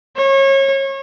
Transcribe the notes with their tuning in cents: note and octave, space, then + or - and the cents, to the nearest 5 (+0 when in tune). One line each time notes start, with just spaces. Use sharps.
C#5 -30